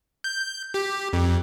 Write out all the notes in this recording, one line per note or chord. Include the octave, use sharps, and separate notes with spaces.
G6
G4
F2